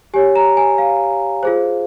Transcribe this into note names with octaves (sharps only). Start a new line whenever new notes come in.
G4 C#5 G#5
A#5
G#5
F5
F4 G#4 C5